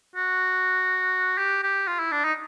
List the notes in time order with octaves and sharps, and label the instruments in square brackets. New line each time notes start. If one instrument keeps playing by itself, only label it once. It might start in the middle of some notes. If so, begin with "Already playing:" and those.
[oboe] F#4
G4
G4
F4
E4
D4
D#4